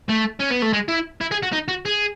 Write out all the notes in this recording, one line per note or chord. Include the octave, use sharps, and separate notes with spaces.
A3
C#4
B3
A3
G#3
E4
E4
G#4
F#4
D#4
F#4
G#4